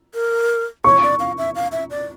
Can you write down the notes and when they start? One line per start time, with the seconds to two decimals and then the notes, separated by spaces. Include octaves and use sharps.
0.14 A#4
0.84 C#5 C#6
1.03 D5
1.19 F5
1.38 E5
1.55 F5
1.72 E5
1.90 D5